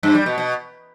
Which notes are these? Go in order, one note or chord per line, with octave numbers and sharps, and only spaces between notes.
G2
G3
B2
B2